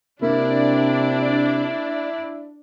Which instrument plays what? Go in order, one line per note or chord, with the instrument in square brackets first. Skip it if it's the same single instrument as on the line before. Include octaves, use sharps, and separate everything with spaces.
[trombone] C3 [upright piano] A#3 [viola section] D4 D5 [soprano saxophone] E4